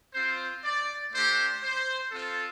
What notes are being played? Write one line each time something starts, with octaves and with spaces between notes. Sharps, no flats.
C4 F4 C5
D5
A3 D4 G4 C5
C5
C4 F4 A4